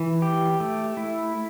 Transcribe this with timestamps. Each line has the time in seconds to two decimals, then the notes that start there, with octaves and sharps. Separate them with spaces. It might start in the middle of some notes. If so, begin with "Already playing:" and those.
Already playing: E3
0.22 G4
0.60 A3
0.97 E4